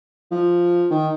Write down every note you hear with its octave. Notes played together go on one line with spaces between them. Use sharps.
F3
D#3